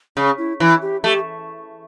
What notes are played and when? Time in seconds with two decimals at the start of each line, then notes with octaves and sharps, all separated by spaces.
0.17 C#3 C#4
0.38 E4
0.60 E3 E4
0.82 G4
1.04 A3 G4